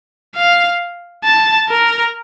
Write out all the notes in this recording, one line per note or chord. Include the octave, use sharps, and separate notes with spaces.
F5
A5
A#4